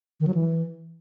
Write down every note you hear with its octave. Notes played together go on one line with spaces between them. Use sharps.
D#3
F#3
E3